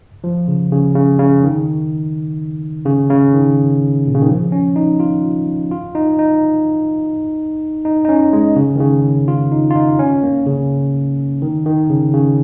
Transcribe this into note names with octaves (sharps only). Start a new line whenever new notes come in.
F3
C#3
C#3
C#3
C#3
D#3
C#3
C#3
D#3
A#2
C#3
D#3
F3
C#4
D#4
F4
F4
D#4
D#4
D#4
D#4
C#4
G#3
C#3
D#3
C#3
F4
D#4
F4
D#4
C#4
A#3
C#3
D#3
D#3
C#3
C#3